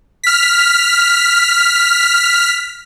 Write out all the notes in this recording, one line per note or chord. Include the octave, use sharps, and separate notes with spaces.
F6 B6